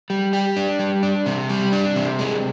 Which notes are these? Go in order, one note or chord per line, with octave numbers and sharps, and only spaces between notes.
G3
G4
D4
G3
D4
C3
G3
D4
C3
G#3